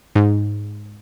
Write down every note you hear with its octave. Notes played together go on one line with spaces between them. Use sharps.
G#2